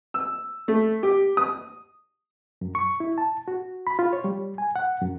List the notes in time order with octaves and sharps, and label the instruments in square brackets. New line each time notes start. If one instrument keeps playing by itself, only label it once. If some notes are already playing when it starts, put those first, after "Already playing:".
[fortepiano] E6
A3
G4
D#6
[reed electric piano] F#2
C#6
E4
A5
F#4
B5
F4
C#5
G3
G#5
F#5
F#2